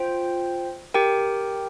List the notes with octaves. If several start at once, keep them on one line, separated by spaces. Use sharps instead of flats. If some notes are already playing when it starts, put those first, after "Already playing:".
Already playing: F4 C5 G5
G4 A#4 G5